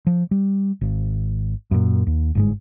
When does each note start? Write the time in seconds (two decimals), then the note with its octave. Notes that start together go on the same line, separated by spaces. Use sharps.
0.07 F3
0.31 G3
0.81 G#1
1.71 F#2 A#2
2.07 D#2
2.35 G1 G#2 G#3